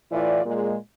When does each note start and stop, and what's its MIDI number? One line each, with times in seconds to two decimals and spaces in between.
0.12 0.42 45
0.12 0.42 52
0.12 0.42 65
0.12 0.42 74
0.45 0.75 46
0.45 0.75 56